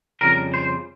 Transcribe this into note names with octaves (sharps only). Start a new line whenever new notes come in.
F2 C#3 G3 A#4
C5